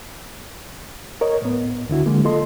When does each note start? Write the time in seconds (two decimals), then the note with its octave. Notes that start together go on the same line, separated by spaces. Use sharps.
1.21 A#4 C#5 D#5
1.42 A2 B3
1.89 D2 D3 E4 F#4
2.06 D3 F#3 G#3 A#3
2.25 F4 A4 D#5 C6